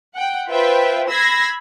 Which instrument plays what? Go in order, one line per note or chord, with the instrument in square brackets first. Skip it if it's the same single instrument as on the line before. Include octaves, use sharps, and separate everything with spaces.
[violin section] F#5 G5
F4 B4 C5 E5 G5
B5 E6 G#6 A#6 C7